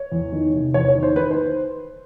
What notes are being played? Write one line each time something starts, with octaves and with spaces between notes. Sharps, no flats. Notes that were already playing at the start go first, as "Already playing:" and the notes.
Already playing: C#5
E2
D#3
C3
E2 C#5
C#5
D#3
C5
D#3 B4
C5